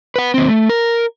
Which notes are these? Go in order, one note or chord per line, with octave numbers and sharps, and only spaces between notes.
B4 F#5
D#2 C4
A3
A#4